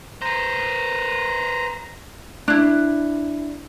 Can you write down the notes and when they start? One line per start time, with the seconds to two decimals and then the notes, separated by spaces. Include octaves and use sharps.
0.22 B4 C5 A#5
2.48 D4 E4